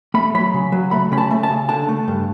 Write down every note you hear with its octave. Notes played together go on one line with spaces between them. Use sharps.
A3 B5
F#3 B5
C#3
F#3
A3 B5
C#3 B5
A5
A3
A5
C#3
D3 A5
A3
G2